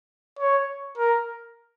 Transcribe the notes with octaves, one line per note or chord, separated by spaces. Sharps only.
C#5
A#4